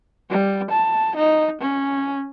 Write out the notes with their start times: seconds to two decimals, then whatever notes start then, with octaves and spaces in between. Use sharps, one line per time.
0.30 G3
0.70 A5
1.16 D#4
1.61 C#4